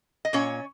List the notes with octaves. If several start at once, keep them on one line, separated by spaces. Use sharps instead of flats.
D#5
A#2 C#4 C#5